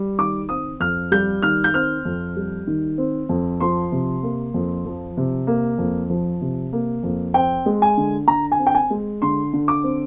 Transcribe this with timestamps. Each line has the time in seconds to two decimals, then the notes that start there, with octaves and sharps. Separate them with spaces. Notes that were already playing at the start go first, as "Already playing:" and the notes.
Already playing: G3
0.18 D#3 D6
0.49 C4 D#6
0.80 F2 F6
1.12 G3 G6
1.42 D#3 F6
1.64 G6
1.74 C4 F6
2.05 F2
2.36 G3
2.67 D#3
2.98 C4
3.29 F2
3.60 F3 C6
3.92 C3
4.23 A#3
4.54 F2
4.85 F3
5.17 C3
5.47 A#3
5.78 F2
6.10 F3
6.41 C3
6.73 A#3
7.03 F2
7.34 C4 G5
7.66 G#3
7.82 G#5
7.97 D3
8.28 D3 A#5
8.52 G#5
8.59 C4
8.67 G5
8.75 G#5
8.90 G#3
9.22 D3 C6
9.53 D3
9.68 D6
9.84 C4